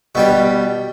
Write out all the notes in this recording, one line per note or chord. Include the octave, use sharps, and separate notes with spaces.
B2 G3 G4